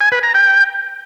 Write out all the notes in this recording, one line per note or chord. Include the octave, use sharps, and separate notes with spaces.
G#5
B4
A#5
G5